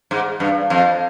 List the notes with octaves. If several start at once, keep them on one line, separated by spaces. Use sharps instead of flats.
G#2
G2
F2